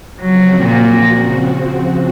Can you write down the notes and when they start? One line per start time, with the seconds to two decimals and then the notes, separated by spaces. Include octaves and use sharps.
0.21 C#3 F3 F#3 C4 F#4
0.64 A#2